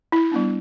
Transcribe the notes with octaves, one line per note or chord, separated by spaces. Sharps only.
E4
G3 B3 D4